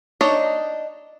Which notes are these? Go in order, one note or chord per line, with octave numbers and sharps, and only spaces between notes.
D4 D#4 C#5 D#5